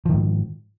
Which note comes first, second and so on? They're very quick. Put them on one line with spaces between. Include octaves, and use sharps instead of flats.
F3 D#3 G#2